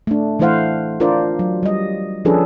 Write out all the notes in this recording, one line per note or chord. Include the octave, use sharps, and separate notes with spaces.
A3 D4
E3 A3 E4 C5 F5 F#5
D4 F4 A#4 C5 D5
F#3
G3 D#5
F3 C#4 D4 G#4 A4 B4